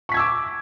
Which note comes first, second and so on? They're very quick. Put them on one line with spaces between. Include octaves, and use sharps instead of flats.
C#6 B6 G#6 E6 D6